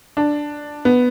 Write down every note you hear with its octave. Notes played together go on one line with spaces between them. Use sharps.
D4
B3